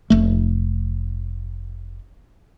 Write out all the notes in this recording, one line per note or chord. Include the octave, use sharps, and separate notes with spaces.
F1 A3